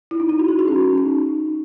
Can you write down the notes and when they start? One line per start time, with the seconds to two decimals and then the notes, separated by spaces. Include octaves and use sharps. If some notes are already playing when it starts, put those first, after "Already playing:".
0.11 E4
0.20 D#4
0.29 E4
0.39 F#4
0.48 G#4
0.59 F#4
0.68 C#4
0.83 C#4
0.98 D#4